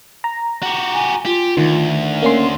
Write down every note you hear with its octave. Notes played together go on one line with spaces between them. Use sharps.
A#5
F#4 G4
G#5
F4 G4
D2 D#3
A#3 C#4 A#4 C6